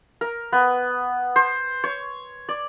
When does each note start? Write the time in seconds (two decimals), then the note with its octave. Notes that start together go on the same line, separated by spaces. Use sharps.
0.21 A#4
0.53 B3
1.36 C5
1.84 C#5
2.49 D5